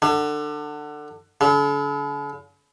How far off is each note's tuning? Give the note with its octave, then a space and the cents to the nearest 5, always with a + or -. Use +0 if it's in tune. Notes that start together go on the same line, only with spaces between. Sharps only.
D3 +25
D3 -45